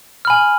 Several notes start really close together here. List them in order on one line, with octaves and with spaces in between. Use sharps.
F6 B5 G#5